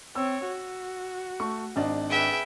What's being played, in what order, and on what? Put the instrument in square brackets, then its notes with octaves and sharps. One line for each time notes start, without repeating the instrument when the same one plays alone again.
[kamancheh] C4 C#5 [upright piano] E6
[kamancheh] F#4
[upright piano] A3 C#6
G#1 D4 D#5
[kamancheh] G#4 B4 [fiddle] E5 G5